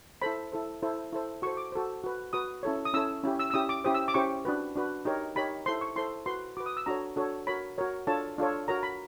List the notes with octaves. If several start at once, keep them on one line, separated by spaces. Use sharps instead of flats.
E4 A4 C5 B5
E4 A4 C5
E4 A4 C5
E4 A4 C5
F#4 A4 C5 C#6
D6
F#4 A4 C5
F#4 B4
F#4 B4 D#6
C#4 E4 A4 C#5
D#6
C#4 E4 A4 C#5 E6
C#4 E4 G4
E6
E6
C#4 E4 G4 D#6
D6
C#4 E4 G4 C5 D#6
E6
D6
C#4 E4 G4 C5 C#6
D4 F#4 B4
D4 F#4 B4
D#4 G4 A#4 C#5
D#4 G4 A#4 C#5 B5
E4 A4 C5 C6
C#6
E4 A4 C5 C6
F#4 B4 C6
F#4 B4 D6
D#6
E6
D4 F#4 A4 C#5 A#5
D4 F#4 A4 C#5
F#4 A#4 C#5 B5
F#4 A#4 C#5
D4 F4 A4 C#5 A5
D4 F4 A4 C#5
F#4 A#4 C#5 A#5
B5